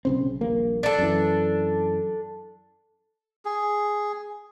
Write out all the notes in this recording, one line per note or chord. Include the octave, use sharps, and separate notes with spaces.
B1 C#3 C4
D#1 A#1 A#3
D4 A4
F#2 E3
G#4